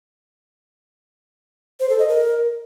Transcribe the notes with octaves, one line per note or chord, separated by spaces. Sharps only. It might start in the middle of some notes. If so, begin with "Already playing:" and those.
C5
A4
D#5
A#4